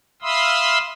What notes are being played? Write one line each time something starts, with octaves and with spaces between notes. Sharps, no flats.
E5 F5 B5 C6 D#6 E6